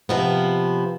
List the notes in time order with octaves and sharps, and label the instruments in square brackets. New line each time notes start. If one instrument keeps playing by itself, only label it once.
[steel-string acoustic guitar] C3 F3 B3